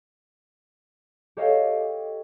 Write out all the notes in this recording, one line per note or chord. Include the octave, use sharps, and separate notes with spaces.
G4 A4 C#5 D#5 F5 G5